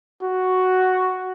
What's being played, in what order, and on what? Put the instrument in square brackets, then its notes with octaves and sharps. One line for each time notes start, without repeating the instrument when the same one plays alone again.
[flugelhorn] F#4